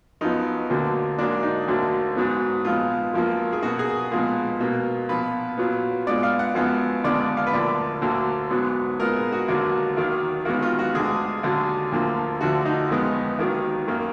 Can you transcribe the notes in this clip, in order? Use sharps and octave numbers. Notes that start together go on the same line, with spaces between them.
F#2 F3 B3 D#4
D2 D3 F#3 A#3
G#2 F#3 A#3 D4
D#4
D2 D3 F#3 A#3
G#2 F#3 B3
A#2 F3 G#3 B3 F4
F#2 F3 A#3
G#4
B2 A#3 F#4
G#4
A#2 F3 G#3 B3
B2 A#3
A#2 F3 B3 B4
A#2 F#3 B3
A#2 G#3 B3 D5
F5
F#5
F#2 F3 G#3 B3 F5
D#2 D3 F3 G#3 B3 D5
D5
F5
B4
D2 D3 F3 A#3 D5
D2 D3 F#3 A#3
G#2 F#3 B3
A#2 G#3 B3 A#4
G#4
F#4
D#2 D3 F#3 A#3
D#2 D#3 F#3
D#2 D#3 G#3 B3 F#4
F4
F#4
D2 D3 G#3 G#4
D#2 D3 F#3
D2 D3 F3 A#3
D2 D3 F3 F#4
D#4
F2 D#3 G#3 B3
D#2 D#3 F#3
F#2 D#3 A#3